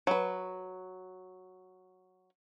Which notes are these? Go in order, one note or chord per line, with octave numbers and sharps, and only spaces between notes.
F#3 B4